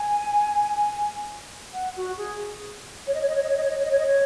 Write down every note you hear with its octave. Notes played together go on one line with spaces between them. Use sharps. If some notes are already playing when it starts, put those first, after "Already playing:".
Already playing: G#5
F#5
F#4
G#4
C#5
D#5
C#5
D#5
C#5
D#5
C#5
D#5
C#5
D#5
C#5
D#5
C#5
D#5
C#5